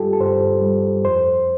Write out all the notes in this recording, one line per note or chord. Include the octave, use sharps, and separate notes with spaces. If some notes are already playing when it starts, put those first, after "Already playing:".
Already playing: G2 G3 F4 G4 A4
A4
G2 C5
G3
F2 C5